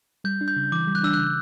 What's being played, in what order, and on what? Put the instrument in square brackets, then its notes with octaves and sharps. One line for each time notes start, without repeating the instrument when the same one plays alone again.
[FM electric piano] G3 [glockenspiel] G6
[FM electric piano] D4
[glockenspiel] G6
[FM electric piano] C#3
[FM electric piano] E3 [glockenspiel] D6
[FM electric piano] G3
[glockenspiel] F#6
[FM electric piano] D4 [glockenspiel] E6
[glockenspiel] F#6
[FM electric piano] C#3